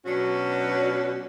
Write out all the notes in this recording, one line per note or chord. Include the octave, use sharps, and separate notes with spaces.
B2 F#3 C#4 D4 F#4